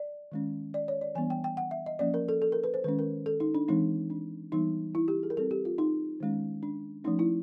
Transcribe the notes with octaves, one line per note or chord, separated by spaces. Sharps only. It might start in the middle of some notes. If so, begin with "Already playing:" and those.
Already playing: D5
D#3 G#3 C#4
D5
C#5
D5
E3 G3 B3 D4 G#5
G5
G5
F#5
E5
D#5
F3 A#3 C#4 D5
A#4
A4
A4
A#4
B4
C5
D#3 G#3 C#4 B4
A#4
A4
D#4
D4
E3 G#3 C4 D#4
D4
E3 G3 B3 D#4
E4
G4
G#4
A#4
G3 C4 A4
G4
F4
D#4
D#3 G#3 C#4
D4
F3 A3 C#4 D#4
E4